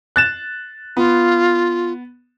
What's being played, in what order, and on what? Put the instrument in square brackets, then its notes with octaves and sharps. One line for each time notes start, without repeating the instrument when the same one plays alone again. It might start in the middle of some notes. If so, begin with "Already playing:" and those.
[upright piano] F#6 A6 E7
[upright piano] B3 [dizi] F4